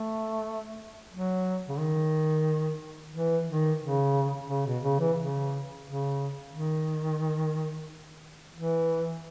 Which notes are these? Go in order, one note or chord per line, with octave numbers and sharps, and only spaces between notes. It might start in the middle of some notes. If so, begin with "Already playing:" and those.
Already playing: A3
F#3
C#3
D#3
E3
D#3
C#3
C#3
B2
C#3
E3
C#3
C#3
D#3
E3